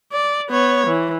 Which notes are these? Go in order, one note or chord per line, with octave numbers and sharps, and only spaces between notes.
D5
B3 C#5
E3